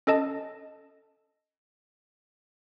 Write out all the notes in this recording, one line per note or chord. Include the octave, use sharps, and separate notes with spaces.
C#4 A4 D#5 A5